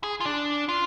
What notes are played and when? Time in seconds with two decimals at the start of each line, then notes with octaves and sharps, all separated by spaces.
0.04 G#4
0.20 F4
0.25 D4
0.69 F4